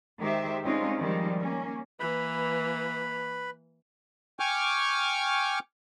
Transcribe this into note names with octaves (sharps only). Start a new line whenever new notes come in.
D#3 G#3 G4 C5 E5
G3 G#3 C4 C#4 D#4 F4
D#3 F3 G3 G#3
A#3 C#4
E3 A#3 B4 B5
G5 G#5 C#6 D6 F6